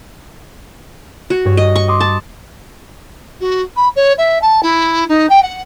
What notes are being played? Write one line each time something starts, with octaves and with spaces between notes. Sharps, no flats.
F#4
G2 C#5
D#5
C#6
C6 D6 D#6
A5
F#4
B5
C#5
E5
A5
E4
D#4
G5
F#5